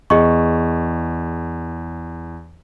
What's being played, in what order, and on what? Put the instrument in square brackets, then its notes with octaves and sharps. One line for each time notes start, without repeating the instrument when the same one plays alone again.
[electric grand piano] E2 [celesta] G#4 D#5 C#6